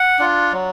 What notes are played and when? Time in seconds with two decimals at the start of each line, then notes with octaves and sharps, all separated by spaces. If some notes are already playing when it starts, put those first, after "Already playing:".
Already playing: F#5
0.19 D4 F4
0.52 F#3